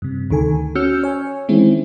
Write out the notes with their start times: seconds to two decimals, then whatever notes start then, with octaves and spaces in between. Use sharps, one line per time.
0.02 G2 C3
0.30 D2 D#3 A4 G#5
0.75 C#4 F#4 E6 F6 G6 C#7
1.03 C#5 G#5
1.49 D#3 E3 G#3 C4 C#4 E4